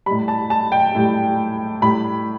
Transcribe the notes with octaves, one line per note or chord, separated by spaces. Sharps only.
A2 G3 B5
A5
A5
G5
A2 G3
A2 G3 B5